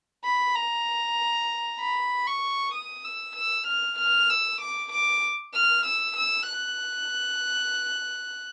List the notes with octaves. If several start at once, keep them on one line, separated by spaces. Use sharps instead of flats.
B5
A#5
B5
C#6
D#6
E6
E6
F6
F6
E6
D6
D6
F6
E6
E6
F#6